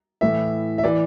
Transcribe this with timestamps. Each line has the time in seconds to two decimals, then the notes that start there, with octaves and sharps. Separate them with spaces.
0.21 A2 E3 E5
0.78 E5
0.84 E3 D5